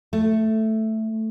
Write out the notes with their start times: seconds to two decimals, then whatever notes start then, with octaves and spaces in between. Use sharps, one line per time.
0.13 A3